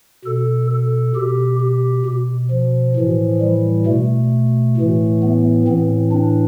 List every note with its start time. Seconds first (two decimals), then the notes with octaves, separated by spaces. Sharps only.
0.25 B2 A4
0.71 A4
1.15 B2 G4
1.60 G4
2.06 B2
2.51 F3
2.96 A2 E3
3.41 G3
3.86 B2 A3
4.77 A2 E3
5.23 B3
5.67 A2 E3 C4
6.12 D4